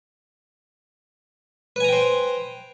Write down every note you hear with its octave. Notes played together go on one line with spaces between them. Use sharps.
B4 C5 G5 G#5 A#5